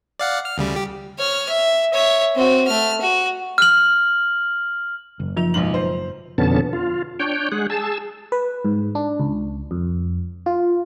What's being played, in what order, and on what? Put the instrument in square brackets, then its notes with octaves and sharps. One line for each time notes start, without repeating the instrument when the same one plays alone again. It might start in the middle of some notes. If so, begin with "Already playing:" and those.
[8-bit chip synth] D5 F5 F#5
F6
D2 C#3 G3
G4
[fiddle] C#5 F6
E5
C#5 E5
C4 F#4
A3 F6
F#4
[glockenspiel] F6 F#7
[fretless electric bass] F#1
[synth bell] F3 F4 F7
[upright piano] B1 G#2 F#7
C5
[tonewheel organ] F2 B2 D3 B3 C#4 A5
F4
D4 C#5 G5
G#3 G#4 F#5
G#4 A5 E6
[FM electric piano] B4
G#2
D4
C#2
F2
F4